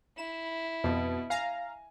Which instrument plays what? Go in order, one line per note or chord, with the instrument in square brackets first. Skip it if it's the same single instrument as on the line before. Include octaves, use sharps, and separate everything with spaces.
[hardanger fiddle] E4 [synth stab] E7
[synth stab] F2 [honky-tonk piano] B2
[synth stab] F5 A#5 [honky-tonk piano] G#5